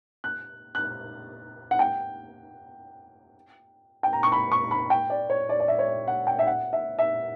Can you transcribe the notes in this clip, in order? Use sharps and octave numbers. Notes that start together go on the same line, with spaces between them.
F#6
F#6
F#5
G5
G5
A#5
C#6
B5
C#6
B5
G5
D5
C#5
D5
D5
E5
C#5
D5
F#5
G5
E5
F#5
E5
E5